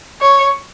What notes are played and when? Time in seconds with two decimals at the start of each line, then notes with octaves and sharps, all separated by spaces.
0.21 C#5